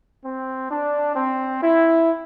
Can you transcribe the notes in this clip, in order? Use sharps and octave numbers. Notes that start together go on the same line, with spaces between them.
C4
D4
C4
E4